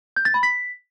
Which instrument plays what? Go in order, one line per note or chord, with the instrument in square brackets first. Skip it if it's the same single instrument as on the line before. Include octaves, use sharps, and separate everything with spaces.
[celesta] G6
A6
B5
B6